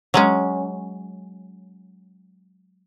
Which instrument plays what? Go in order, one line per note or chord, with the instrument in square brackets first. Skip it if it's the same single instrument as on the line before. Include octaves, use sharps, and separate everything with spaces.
[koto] F#3 G#3 C#4